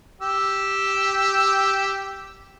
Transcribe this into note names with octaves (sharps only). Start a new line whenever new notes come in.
G4 E6